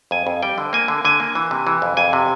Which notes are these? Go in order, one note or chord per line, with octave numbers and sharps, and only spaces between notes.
F2 G#5
F2
G3 G5
D3
A#3 G#5
D3
D3 G#5
A#3
E3
C3
E3
F2
F2 G#5
C3